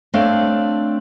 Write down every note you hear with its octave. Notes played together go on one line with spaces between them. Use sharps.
A3 C4 D4 C#5 F5